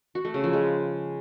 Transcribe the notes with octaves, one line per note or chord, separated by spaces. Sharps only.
F#4
A3
C#3
F3
G#3